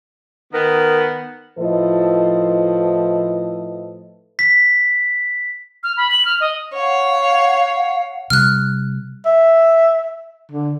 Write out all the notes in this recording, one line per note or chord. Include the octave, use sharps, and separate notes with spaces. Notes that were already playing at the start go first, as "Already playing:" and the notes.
D#3 B3 A#4
A2 F3 E4 A4 B4 D#5
B6
F6
B5
F#7
F6
D#5
C#5 F5 F#5
C3 G3 F6 F#6
E5
D3